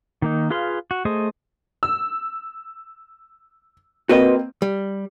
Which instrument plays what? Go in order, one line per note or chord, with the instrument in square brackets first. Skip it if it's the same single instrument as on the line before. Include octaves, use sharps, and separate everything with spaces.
[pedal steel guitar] D#3 A#3 D#4
F4 G#4 B4 F5 C6
F#4
A3 G#4 C5 D#5
[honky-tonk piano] E6
[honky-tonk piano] A#3 C4 [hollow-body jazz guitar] F#4 B4 D#5
[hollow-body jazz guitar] G3